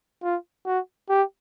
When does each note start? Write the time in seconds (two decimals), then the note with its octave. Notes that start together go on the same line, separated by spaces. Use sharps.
0.23 F4
0.66 F#4
1.10 G4